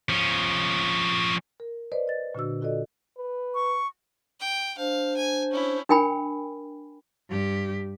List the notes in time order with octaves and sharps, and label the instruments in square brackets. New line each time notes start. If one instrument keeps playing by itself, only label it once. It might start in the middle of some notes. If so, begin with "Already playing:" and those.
[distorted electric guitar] F3 C#4
[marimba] A#4
B4 C5 D5 D#5
D#5 A6
A#2 D3 D4 F#4 E6
F4 F#4 A4 D5 D#5
[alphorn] B4
[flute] C#6
[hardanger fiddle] G5
[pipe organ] D4 C5 [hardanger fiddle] F5
[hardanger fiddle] G#5
C#4 E4
[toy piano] D4 A#4 G5 G#5 B5
[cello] G2 G4